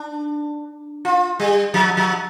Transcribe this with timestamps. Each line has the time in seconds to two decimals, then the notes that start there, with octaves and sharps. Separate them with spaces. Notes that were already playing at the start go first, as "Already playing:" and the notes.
Already playing: D4
1.05 F4
1.39 G3
1.74 F3
1.97 F3